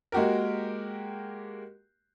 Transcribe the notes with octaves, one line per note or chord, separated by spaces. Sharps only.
G#3 A#3 F#4 G4 A#4